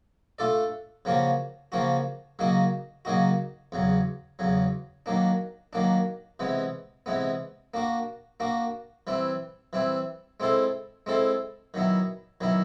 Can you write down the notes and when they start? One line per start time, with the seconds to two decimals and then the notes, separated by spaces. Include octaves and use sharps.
0.39 A3 D4 F4 A4 D5
1.05 C#3 F3 A#3 C#4 F#4
1.72 C#3 F3 A#3 C#4 F#4
2.39 C#3 F#3 A#3 D#4 F#4
3.05 C#3 F#3 A#3 D#4 F#4
3.72 E2 C#3 F#3
4.39 E2 C#3 F#3
5.06 D#3 F#3 A#3 D4
5.73 D#3 F#3 A#3 D4
6.39 C3 E3 G#3 B3
7.06 C3 E3 G#3 B3
7.74 A#3 D4 F#4
8.40 A#3 D4 F#4
9.07 E3 G3 C4 E4
9.73 E3 G3 C4 E4
10.40 G#3 C4 E4 A4 C5
11.06 G#3 C4 E4 A4 C5
11.74 D#3 F#3 B3 E4
12.41 D#3 F#3 B3 E4